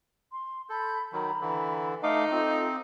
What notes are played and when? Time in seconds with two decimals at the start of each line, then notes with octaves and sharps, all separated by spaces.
0.33 C6
0.69 A4 B5 G6
1.13 D#3 F#3 A#5 B5
1.41 D3 E3
2.03 A3 D#4 F5 D6
2.31 C4 F4 A4 F5